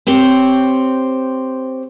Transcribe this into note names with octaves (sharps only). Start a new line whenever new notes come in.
C4 G4 C5 C#5